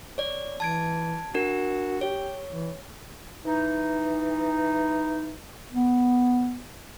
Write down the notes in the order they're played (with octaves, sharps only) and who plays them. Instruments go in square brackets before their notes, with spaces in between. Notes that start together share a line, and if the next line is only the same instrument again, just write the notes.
[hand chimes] C#5 D5
[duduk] E3 [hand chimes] A5 G#6 D7
[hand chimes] D4 A#4 [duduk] F#4
[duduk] G4 [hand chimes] C#5
[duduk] E3
[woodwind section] E3 D#4
[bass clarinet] B3